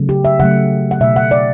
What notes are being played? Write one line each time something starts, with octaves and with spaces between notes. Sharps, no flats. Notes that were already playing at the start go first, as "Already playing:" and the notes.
Already playing: C#3 F#3 A3
G4
E5
C#3 F#3 A3 F#5
F#5
B2 A3 E5
F#5
D5